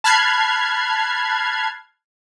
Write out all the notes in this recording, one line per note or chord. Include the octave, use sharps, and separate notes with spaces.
A5 B5 F6 F#6 G#6 C7